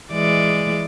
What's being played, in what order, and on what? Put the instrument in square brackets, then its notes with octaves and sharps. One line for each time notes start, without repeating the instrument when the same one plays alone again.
[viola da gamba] E3 G#3 D5